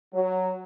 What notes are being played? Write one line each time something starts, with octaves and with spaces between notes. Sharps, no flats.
F#3